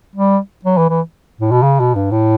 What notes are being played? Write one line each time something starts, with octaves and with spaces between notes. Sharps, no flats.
G3
F#3
E3
E3
A2
B2
C#3
B2
G2
A2